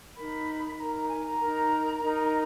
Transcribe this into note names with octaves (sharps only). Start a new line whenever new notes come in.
D#4 A#4 B5
D#4 A#4 A#5
A#5
G#5
A#5
D#4 A#4
D#4 A#4